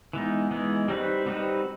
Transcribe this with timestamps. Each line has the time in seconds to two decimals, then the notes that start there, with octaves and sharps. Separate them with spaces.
0.13 E3 G#3 B3 D#4
0.51 E3 G#3 B3 D#4
0.88 G3 C4 D#4 F#4 B4
1.26 G3 C4 D#4 F#4 B4